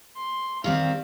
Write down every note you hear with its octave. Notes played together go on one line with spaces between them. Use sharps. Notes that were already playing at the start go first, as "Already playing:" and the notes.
C6
D#3 G3 C4 F5